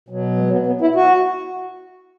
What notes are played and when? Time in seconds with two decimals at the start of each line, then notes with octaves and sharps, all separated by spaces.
0.08 B2 F#3
0.37 G#3
0.52 B3
0.66 B3
0.81 E4
0.96 F#4